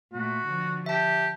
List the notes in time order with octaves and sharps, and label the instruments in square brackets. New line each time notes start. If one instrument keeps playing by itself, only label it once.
[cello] A#2 A3 [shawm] F#4
[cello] D3 F3
[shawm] G4 [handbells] E5 A5